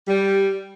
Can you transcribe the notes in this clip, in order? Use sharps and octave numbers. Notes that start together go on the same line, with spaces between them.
G3